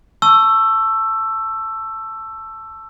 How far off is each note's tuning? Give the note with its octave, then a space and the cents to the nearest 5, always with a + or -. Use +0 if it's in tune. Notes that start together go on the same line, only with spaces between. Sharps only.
A5 +0 C#6 +0 E6 +15